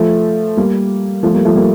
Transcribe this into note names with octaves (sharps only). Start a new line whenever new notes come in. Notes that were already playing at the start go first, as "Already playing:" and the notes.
Already playing: F3 A3
G3 A#3
F3 A3
G3 A#3
F3 A3
G3 A#3